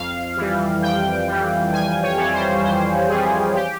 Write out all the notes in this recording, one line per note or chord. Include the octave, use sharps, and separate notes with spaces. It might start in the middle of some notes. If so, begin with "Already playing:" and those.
Already playing: F2 F5
E3 G3
F2 G5
E3 G3
F2 G#5
C#5
E3 G3
C5
F2 C5
E3 G3 G#4
G4